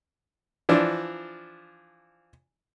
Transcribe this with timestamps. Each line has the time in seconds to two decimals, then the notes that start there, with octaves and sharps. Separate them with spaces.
0.69 E3 F3 D4